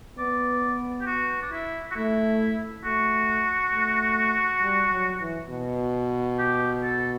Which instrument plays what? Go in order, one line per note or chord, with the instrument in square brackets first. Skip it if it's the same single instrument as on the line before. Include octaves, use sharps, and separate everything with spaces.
[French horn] B3 [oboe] D5
[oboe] G4
F#4
D4
E4
F#4
[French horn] A3 [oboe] E4
[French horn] A3 [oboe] F#4
[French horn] A3
G3
F#3
E3
B2
[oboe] G4
A4